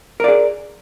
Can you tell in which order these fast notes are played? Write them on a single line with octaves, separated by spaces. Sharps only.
A#4 D5 G#4